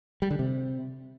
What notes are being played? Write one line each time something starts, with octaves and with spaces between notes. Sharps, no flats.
G3
D3
C3